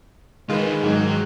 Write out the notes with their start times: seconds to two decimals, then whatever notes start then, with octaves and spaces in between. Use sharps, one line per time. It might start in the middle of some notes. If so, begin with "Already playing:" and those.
0.49 D#3 G#3 F4 B4
0.83 G#2 F#3 D#4